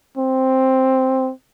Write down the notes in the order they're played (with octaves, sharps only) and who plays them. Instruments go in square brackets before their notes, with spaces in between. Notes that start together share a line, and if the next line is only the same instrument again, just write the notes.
[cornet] C4